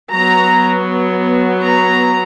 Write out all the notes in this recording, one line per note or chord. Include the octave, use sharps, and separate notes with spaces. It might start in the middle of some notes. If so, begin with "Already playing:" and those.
F#3 B3 A#5
A#5